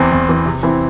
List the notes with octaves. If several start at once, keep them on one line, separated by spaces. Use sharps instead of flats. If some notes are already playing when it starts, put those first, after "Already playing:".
Already playing: E2 E3 C4
E2
E3 C4
C3
E3 C4 E4